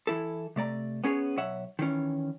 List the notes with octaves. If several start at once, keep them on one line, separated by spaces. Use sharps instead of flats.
E3 E4 A4
C3 A3 D5 A#5
B3 C#4 G#4 A#4 C#5
B1 C#5 E5 F#5
D#3 E3 C#4